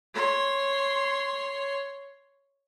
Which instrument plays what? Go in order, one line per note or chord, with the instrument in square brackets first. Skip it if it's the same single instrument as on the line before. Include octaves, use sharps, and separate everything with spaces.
[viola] C#5 C6